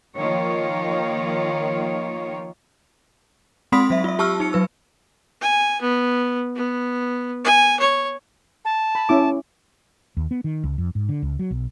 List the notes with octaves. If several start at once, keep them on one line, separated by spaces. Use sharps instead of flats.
D#3 F3 A#3 F4 C#5
G#3 C4 B5 C6 D#6 B6
F#3 E5
F4 E5
G4 A5 C#6 E6 F6
D#4 C#7
F#3 B4 E6
G#5
B3
B3
G#5
C#5
A5
B5
C#4 E4 D6
D#2
B3
D#3
C#2
F2
G#2
D3
C#2
F#3
B1